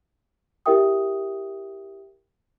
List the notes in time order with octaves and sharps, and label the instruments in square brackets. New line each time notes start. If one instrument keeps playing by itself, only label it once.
[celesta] E4 G4 A#4 E5 G5 D#6